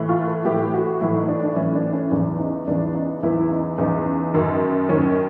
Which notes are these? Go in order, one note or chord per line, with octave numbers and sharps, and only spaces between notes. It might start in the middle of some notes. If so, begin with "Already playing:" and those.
Already playing: A2 E3
F4
A4
A2 E3 G4
F#4
A2 E3 E4
D#4
D4
D4
A2 E3 C#4
D4
C#4
E2 C#3 E3 D4
D#4
E2 C#3 E3 D4
D#4
E2 C#3 E3 E4
D#4
E2 C#3 E3 D#4
F#2 D#3
F#2 D#3 C#4